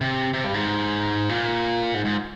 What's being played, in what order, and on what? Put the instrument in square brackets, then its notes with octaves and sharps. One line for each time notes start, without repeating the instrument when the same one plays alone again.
[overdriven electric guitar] C3
C3
G2
G#2
A#2
G#2
G#2